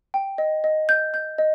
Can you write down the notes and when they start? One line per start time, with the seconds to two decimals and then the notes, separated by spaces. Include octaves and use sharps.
0.14 G5
0.38 D#5
0.64 D#5
0.89 G6
1.14 G6
1.38 D#5